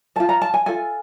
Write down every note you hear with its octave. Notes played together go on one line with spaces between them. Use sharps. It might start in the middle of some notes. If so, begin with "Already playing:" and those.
A4 A5
F4
A#5
A5
G#5
F4 A4 G#5